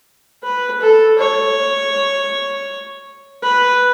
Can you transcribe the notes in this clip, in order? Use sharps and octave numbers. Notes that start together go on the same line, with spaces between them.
B4
A4
C#5
B4